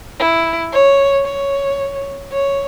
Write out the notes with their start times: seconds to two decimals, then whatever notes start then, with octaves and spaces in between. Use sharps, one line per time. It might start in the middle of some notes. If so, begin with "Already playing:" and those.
0.19 E4
0.73 C#5
1.25 C#5
2.32 C#5